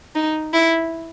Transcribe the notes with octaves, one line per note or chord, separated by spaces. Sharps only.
D#4
E4